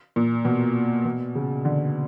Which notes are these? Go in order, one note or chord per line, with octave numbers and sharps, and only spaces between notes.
A#2
B2
B2
C#3
D3